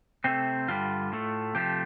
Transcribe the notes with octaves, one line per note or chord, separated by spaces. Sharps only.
C3 A3 C4
G2 D3 G3 F4
A2 A3
C3 F3 A3 G4